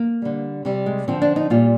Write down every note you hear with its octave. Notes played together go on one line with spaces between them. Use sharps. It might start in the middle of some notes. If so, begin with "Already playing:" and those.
Already playing: A#3
D3 G3
C3 G3
G#3
D3 F3 C4
D4
D#4
A#2 G3 F4